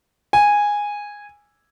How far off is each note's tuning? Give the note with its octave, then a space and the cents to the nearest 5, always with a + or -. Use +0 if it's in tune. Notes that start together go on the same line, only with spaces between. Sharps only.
G#5 -10